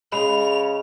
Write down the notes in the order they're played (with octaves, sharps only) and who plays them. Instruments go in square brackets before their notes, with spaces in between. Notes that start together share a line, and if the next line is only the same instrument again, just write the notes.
[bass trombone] C#3 [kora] G#3 [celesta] B5 [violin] F7